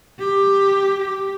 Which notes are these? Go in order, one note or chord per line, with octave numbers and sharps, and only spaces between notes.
G4
G4